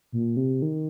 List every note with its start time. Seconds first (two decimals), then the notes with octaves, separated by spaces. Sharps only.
0.12 A#2
0.37 C3
0.62 D#3